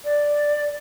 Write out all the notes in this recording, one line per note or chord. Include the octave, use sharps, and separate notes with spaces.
D5